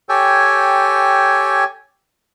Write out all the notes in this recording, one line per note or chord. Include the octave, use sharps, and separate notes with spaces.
G4 A4 C#5 G5 G#5